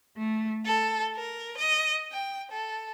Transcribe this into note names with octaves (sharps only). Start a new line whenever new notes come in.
A3
A4
A#4
D#5
G5
A4